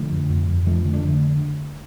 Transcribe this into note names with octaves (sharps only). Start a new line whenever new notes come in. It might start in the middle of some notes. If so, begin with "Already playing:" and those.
Already playing: D3 F3 A3
F2
F2
F2
F2 F3 A3
D3
A3 D4
D3